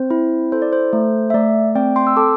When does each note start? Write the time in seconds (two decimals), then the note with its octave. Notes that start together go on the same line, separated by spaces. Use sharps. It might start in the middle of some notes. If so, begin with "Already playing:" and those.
Already playing: C4 C5
0.10 E4
0.52 A4 C5
0.62 D5
0.73 C5
0.93 A3
1.30 E5
1.34 A3 D5
1.75 C4 D5 G5
1.96 G5 C6
2.07 E6
2.17 A4 A5 D6